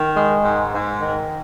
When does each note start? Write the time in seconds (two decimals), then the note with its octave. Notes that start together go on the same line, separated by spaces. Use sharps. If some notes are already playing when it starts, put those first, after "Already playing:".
Already playing: D#3
0.16 G#3
0.44 G#2
0.72 G#2
1.01 D#3